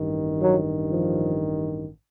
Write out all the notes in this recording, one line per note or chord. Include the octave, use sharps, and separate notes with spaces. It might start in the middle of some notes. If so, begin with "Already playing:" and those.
Already playing: A1 G2 D#3
F#3
F3